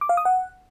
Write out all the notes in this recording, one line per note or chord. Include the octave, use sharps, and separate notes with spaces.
D6
F5
D#6
F#5